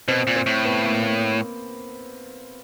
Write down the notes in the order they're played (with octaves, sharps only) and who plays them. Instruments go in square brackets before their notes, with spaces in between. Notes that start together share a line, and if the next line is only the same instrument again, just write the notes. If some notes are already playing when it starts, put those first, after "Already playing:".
[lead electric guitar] B2 [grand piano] C4
[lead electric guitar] A#2
[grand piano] C4
[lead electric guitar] A2
[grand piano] B3
A#3
A#3